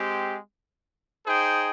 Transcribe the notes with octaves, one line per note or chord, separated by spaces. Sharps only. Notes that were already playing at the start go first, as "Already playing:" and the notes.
Already playing: G#3 C4 G4
D#4 G#4 C5 G5